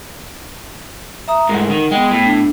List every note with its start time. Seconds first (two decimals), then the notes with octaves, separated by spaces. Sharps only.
1.28 E5 A#5 D#6
1.49 G#2 A3 A#4 F#5
1.70 D#3
1.91 G#3 B3 G5
2.11 A2
2.26 D4